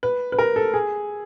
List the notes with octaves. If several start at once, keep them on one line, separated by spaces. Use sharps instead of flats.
B4
B4
A#4
A4
G#4